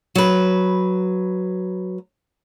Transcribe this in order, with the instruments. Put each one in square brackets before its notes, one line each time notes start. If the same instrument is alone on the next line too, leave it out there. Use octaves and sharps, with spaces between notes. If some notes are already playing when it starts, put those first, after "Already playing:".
[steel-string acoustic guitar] F#3 B4